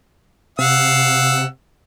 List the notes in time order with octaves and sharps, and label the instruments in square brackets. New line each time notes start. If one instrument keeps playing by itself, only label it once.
[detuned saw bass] C3 [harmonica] F5 F#5 E6